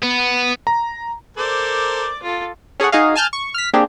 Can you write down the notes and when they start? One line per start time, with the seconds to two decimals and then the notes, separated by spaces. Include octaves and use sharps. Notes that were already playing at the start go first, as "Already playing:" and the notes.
0.02 B3
0.67 A#5
1.37 A4 A#4 C5 D5 D6
2.22 F4 A4
2.80 C#4 G#4 A4 C#5 F#5
2.92 D#4 F#4 G#4 D#5 F5
3.15 G#5 A5 F6 G6 A6
3.33 C#6
3.54 F6 B6
3.73 A#3 C4 D4 G4 G#4